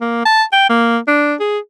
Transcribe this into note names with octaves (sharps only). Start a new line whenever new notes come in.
A#3
A5
G5
A#3
D4
G#4